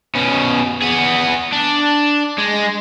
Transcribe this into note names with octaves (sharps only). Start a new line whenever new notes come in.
B2 C#4
B3 G#4
D4
G#3